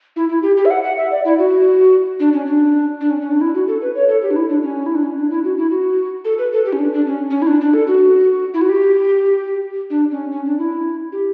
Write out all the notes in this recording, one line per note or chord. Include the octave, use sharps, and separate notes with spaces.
E4
E4
G4
G4
E5
F#5
F#5
E5
D5
E4
F#4
D4
C#4
D4
D4
C#4
C#4
D4
E4
F#4
A4
B4
C#5
A4
G4
D4
E4
D4
C#4
E4
D4
C#4
D4
E4
F#4
E4
F#4
A4
B4
A4
G4
C#4
D4
D4
C#4
C#4
E4
D4
D4
A4
F#4
E4
F#4
G4
D4
C#4
C#4
D4
E4
G4